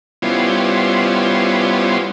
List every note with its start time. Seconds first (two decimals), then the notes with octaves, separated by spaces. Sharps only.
0.22 G3 B3 C#4 E4 F4 C5